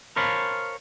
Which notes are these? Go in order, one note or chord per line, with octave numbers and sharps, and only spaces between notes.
A#4 C5 C#5 F5 A5 B5